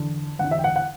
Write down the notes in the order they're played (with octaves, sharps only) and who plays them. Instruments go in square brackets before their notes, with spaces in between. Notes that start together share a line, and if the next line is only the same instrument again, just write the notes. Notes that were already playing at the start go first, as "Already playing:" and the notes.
Already playing: [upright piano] E2 D3
D3 F#5
E2
E5
G5
F#5
F#5